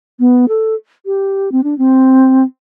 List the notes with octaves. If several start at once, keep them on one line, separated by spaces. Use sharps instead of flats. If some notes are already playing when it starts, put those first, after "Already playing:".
B3
A4
G4
C4
D4
C4